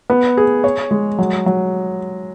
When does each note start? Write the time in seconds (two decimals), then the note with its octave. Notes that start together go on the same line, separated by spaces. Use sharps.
0.10 B3
0.37 G#4
0.64 C#5
0.91 G#3
1.18 F#3
1.46 F#3